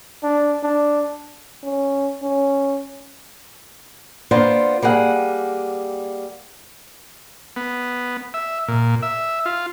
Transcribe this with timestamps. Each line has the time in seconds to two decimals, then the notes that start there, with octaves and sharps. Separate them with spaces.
0.23 D4
0.63 D4
1.63 C#4
2.22 C#4
4.31 A#3 B3 D4 F4 C5
4.82 G3 A#3 G#4 F#5
7.56 B3
8.34 E5
8.68 A#2
9.02 E5
9.45 F4